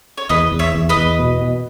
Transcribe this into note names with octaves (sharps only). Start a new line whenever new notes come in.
C#5
E2 B4 D#5
E2
C#5 E5
E2
B4 D#5
E2
B2
B2